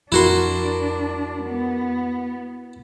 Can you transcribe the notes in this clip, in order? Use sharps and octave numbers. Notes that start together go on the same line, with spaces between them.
F2 D4 E4 F#4 A#4 C6
B3